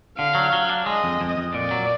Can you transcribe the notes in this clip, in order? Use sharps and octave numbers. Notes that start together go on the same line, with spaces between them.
D3 F5
F#3
F#3
D4
G#3 D#5
F2
F2
F2
A#2 D5
F#3